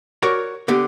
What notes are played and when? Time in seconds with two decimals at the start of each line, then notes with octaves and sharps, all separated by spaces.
0.22 F#4 A#4 C#5 D5
0.68 D3 B3 G4